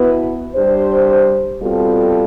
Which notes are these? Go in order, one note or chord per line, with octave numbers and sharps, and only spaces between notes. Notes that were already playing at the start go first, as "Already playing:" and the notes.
Already playing: B2 B3 E4 B4
G3 D4 G4 C5
B2 G3 C4 F4 A4